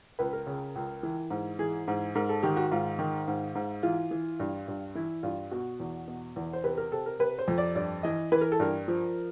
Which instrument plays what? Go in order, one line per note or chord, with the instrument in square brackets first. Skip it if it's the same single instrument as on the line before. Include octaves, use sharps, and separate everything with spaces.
[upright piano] C#2 B4
A#4
C#3
C#2
E3
G#2
E3 G#4
G#2
G#2 A#4
A4
D#3 G4
F#4
G#2 F4
D#3
G#2
G#2
E3 F4
E3
G2
G2
E3 E4
G2 F4
B2 F#4
E2
B2
E2
C5
C3 B4
A#4
C3 A4
A#4
C3 B4
C5
F2
D5
G2 D5
E3 D#5
E3 B4
A#4
A4
G2 A#4
F3